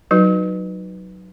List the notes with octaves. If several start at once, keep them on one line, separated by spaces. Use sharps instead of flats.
F#3 D#4 F#4 B4